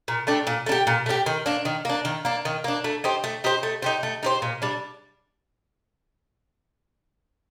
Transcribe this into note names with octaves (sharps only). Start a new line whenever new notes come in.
A#2
A3 D4 G4
A#2
A3 D4
G4
A#2
A3 D4 G4
D#3
A#3 D4
D#3
A#3 D4
D#3
A#3 D4
D#3
A#3 D4
A3
D#4 G4 C5
A3
D#4 G4 C5
A3
D#4 G4 C5
A3
D#4 G4 C5
A#2
G3 D4